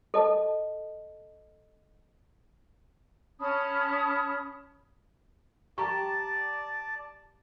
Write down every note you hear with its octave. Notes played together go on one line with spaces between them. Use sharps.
A4 D#5 A5
C#4 A5 B5 D#6
G4 D5 A5 A#5 C#6